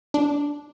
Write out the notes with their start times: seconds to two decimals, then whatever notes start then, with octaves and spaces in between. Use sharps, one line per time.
0.14 D4